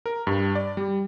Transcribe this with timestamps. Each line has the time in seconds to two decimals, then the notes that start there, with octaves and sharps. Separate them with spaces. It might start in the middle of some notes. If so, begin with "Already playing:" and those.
0.06 A#4
0.27 G2
0.55 D5
0.77 G3